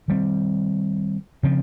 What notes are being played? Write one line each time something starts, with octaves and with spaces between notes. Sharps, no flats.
D#3 G3 C4
C#3 F3 C4